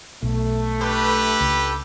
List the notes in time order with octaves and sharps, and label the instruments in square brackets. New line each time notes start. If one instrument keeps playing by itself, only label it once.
[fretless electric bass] B1 B2 [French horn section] A3
[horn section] D4 A5 B5 [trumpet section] G4 A4 B4
[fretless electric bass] C#2